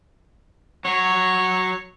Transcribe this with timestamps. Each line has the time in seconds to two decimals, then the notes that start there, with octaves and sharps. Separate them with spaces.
0.85 F#3 C#5